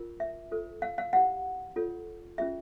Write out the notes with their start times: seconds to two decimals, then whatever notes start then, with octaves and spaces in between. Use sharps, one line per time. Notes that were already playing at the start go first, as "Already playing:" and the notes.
Already playing: F4 A#4
0.20 E5
0.51 F4 A4 C5
0.82 F5
0.98 F5
1.13 E4 G4 C5 F#5
1.76 F4 A4 C#5
2.38 C#4 F4 G#4 E5